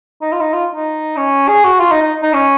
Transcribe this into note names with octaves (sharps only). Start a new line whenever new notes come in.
D#4
F4
D#4
F4
D#4
C#4
G#4
F#4
F4
D#4
D#4
D#4
C#4